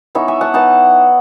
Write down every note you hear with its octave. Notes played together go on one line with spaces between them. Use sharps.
E3 B3 D#4 C#5 E5
E5 G#5
F#5 A5
E3 B3 D#4 F#5 A5